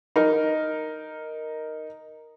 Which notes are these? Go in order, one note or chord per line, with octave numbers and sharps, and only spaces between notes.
D#4 A#4